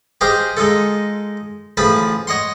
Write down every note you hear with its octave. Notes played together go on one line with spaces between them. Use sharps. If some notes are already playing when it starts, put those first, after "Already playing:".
G4 G#4 C5 D#5 F5
G#3 D#4 F4 A4
A1 F3 G#4 A5 B5
C#5 D#5 F#5 C6